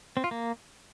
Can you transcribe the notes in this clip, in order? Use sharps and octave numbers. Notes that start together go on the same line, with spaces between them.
C4
F4
A#3